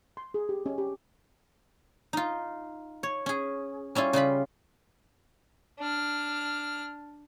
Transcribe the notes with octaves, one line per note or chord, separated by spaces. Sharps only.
C6
G#4
G4
C#4
G4
D#4 F4
C#5
C#4 G#4
G3 C#4 E4 F4
C#3 G3 F4 B5
D4 F6